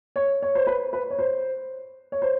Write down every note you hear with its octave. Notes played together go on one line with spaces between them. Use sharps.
C#5
C#5
C5
B4
B4
C#5
C5
C#5
C5